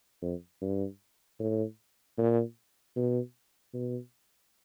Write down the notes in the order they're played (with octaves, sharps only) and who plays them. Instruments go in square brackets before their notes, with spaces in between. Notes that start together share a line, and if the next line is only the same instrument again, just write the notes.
[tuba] F2
G2
A2
A#2
B2
B2